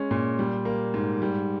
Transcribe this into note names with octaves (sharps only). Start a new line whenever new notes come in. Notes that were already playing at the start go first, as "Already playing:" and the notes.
Already playing: G#3 C#4
A#2
G3
A#3
G#2
G3